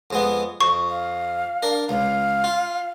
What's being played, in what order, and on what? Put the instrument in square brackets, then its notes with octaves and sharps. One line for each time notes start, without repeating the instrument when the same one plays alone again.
[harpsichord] F2 G#3 B3
[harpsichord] F2 [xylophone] C#6
[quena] F5
[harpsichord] D4 A#4
[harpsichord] C#2 [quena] F5
[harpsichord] F4